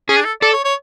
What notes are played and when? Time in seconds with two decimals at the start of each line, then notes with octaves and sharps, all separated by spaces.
0.09 C#4 G#4
0.17 D4
0.25 A4
0.42 A4 D5
0.53 C#5
0.65 C#5